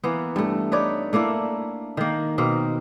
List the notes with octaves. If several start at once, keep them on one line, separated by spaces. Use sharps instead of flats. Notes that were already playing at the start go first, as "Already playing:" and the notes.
E3 A#3 B3
G2 A3
D#4 B4 C#5 D5
A3 A#3 D4 E4
D#3 A#3
B2 A#3 C4